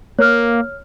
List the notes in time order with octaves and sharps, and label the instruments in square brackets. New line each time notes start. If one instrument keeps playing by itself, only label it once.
[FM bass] A#3 [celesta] C#5 F6